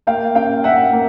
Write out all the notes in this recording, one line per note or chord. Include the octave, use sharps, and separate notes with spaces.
A#3 F5 G5
C#4 F5 G5
A#3 E5 F#5
A#3